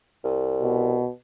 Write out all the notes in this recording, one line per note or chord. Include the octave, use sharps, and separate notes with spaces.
C2
B2